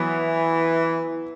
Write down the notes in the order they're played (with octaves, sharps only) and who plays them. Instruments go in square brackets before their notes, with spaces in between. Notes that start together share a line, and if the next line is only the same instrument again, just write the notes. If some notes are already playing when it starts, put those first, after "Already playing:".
Already playing: [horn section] E3 [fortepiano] F#3 B3